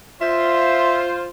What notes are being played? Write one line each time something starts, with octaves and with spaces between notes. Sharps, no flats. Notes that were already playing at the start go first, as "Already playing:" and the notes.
F4 C5 E5